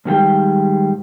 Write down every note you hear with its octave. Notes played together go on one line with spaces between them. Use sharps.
G#2 D#3 G3 G#4 F5 G5